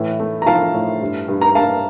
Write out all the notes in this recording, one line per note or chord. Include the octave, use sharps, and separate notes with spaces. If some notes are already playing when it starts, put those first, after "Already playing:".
Already playing: A2 E3
A3
A#5
F3 F5 A5
A2
G2
G2
A#5
G2 F5 A5